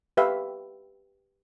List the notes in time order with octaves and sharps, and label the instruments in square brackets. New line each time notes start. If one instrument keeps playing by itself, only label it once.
[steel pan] G4 B4 E5 F5